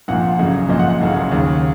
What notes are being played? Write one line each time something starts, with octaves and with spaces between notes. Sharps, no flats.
A#1 A#2 F#5
F#1 F#2 C#3
A#1 A#2 D#5
F#5
F#5
F#1 F#2 C#3
D#2 C#3